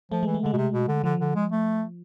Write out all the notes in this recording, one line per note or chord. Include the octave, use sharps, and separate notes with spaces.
F3 A3
E3 G#3
A3
D3 G#3
B2
C3
B2
D3
D3 F3
D3
G#3
A3